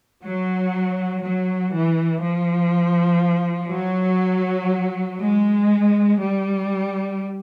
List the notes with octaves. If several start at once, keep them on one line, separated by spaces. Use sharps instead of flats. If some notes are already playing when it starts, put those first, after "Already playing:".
F#3
F#3
E3
F3
F#3
G#3
G3